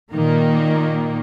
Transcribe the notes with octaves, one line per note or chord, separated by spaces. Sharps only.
A#2 D#3 A#3